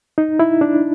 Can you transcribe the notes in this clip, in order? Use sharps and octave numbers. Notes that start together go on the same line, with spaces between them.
D#4
E4
D4